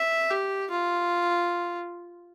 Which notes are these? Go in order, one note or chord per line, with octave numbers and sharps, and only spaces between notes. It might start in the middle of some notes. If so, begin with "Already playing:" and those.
Already playing: E5
G4
F4